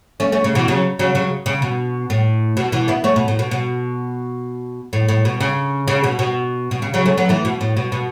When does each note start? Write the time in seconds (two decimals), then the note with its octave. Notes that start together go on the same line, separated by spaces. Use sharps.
0.20 A3 C#4
0.32 A3 C#4
0.44 C#3
0.55 B2 E3
0.68 C#3 F#3
0.99 C#3 F#3
1.15 C#3 F#3
1.46 C#3
1.62 B2
2.10 A2
2.57 B2
2.72 B2 E3
2.88 B3 E4
3.04 A3 C#4
3.16 B2
3.28 A2
3.39 B2
3.51 B2
4.93 A2
5.08 A2
5.25 B2
5.40 C#3
5.88 C#3
6.04 B2
6.19 B2
6.71 B2
6.82 C#3
6.94 C#3 F#3
7.06 A3 C#4
7.18 F#3 B3
7.29 E3 A3
7.45 B2
7.61 A2
7.77 B2
7.92 B2